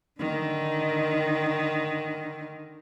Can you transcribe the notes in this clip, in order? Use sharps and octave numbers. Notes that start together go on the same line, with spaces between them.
D3 D#3